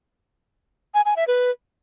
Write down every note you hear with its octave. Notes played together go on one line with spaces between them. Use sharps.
G#5
G#5
E5
B4